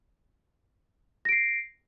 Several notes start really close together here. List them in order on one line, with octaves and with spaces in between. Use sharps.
A#6 D7 C7